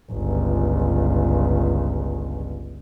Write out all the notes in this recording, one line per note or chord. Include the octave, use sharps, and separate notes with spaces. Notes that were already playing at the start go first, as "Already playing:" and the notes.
G1 C#2